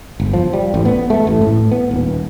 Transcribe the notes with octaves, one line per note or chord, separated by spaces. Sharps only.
G1
F3
G3
A1
B3
A3
A1
A2
B3
D#1